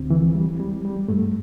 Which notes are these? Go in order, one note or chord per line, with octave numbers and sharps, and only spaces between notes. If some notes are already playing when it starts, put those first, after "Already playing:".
Already playing: D2 C4
E3
G3
G3
G3
G2 A3